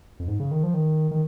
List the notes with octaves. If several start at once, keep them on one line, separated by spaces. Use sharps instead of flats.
F2
G#2
C#3
D#3
F3
D#3
D#3